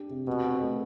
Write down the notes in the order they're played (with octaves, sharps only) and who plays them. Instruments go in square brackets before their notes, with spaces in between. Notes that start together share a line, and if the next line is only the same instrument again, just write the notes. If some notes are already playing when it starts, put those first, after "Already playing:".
Already playing: [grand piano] D4 G4
C3
[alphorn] B2 [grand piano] C4
[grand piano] C4
A3